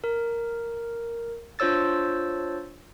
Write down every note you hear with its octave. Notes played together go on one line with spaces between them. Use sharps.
A#4
D4 F4 C5 C#5 E6 A6